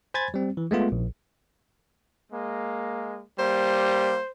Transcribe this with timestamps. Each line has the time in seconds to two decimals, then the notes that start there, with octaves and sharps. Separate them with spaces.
0.14 C5 G#5 B5 G#6 A6
0.34 G3 C4
0.57 E3
0.71 G#3 A3 B3 F4
0.92 A#1
2.31 G#3 A#3
3.39 G3 A#3 C5